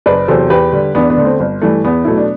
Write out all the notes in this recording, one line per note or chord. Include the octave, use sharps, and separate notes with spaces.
F#1 B4 D5
E2 C3 F#3 A4 C5
E2 G4 B4
D3 G3
E2 B3 D4
B3 D4
D3 A3
C4
G1
G2 E3 A3
E2 B3
B2 F#3 A3 E4
D4